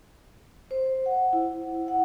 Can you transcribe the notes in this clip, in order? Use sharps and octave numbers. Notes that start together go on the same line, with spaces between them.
C5
F#5
E4
F#5